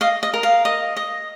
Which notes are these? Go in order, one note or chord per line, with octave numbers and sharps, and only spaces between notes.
D#5 F5
D#5
A#4
F5
D#5
D#5